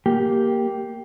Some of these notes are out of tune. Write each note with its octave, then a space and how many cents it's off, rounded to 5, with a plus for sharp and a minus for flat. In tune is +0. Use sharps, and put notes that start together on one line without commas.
A#3 +0 G4 +0